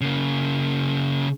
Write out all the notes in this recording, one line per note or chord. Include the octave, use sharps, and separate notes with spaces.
C#3 A#3